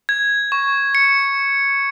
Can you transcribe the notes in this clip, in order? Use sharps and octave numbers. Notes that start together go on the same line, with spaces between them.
G#6
C#6
C#7